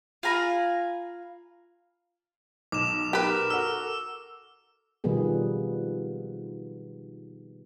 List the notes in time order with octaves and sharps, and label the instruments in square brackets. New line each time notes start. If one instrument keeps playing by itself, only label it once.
[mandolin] F4 G#5 A#5 B5
[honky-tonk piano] B1 [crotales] D6 E7
[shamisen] G4 B4 [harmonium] A#4
[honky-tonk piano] F#4 A4 [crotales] E6
[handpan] B2 D#3 F3 G3 B3 G#4